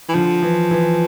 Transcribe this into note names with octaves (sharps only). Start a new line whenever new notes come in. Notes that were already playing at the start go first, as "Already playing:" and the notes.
E3
D3 F3
E3
E3